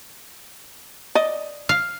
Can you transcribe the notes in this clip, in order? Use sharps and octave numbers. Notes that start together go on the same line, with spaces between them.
D5 D#5
F5